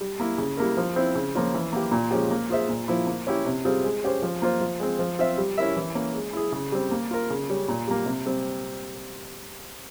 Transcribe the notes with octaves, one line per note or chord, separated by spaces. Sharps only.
G3
A#3 E4
C#3
G3 A#3 E4 A#4
F3
C4 E4
C#3
F3 A#3 C#4 F4
E3
A#3 E4 G4
A#2
F3 G#3 C#4 G4
A#3
F4 G#4 C5 E5
A#2
F3 A#3 E4
A#3
C#4 E4 G4
C3
G3 C4 F4 G#4
G#3
C#4 G4 C5
F3
A#3 F4 C5
F3
G#3 C4
F3
C4 F4 C5 E5
G3
C#4 E4 A#4 E5
E3
A#3 C#4
G#3
E4 G#4
C#3
G3 C4
A#3
F4 A#4
C#3
G3 C#4
A#2
G3 A#3
C3
G3 C4